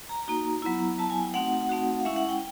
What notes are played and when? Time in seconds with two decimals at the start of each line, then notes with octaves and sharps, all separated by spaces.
0.09 A#5
0.28 A#3 D#4 F#4
0.62 F#3 B3 E4
0.98 F#3 B3 E4 A5
1.10 G#5
1.22 G5
1.34 A3 C4 D#4 F#4 F#5
1.69 A3 C4 D#4 F#4
2.00 F5
2.05 G#3 C#4 E4 E5
2.16 F#5
2.29 G5